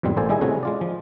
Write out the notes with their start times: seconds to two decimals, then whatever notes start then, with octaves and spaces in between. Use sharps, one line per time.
0.03 E2 G#2 B2 G3 C4
0.17 A1 A#3 A4 C5 D5 G#5
0.29 D#3 G3 E4 G#4 D#5 G#5
0.41 C3 A3 C#4 E4 F#4 G#4
0.63 G#3 F4 D5
0.81 F3